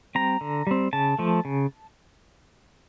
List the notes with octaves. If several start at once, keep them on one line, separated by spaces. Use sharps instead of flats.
G3 C4 A#5
D3
G3 C4
C#3 A5
F3 A3
C#3